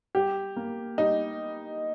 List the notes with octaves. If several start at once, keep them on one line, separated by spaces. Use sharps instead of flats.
G3 G4
A#3
G3 D#4